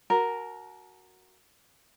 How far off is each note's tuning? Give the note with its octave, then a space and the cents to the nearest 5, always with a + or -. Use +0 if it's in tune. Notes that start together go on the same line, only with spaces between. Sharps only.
F#4 +0 A#4 +0 A5 -35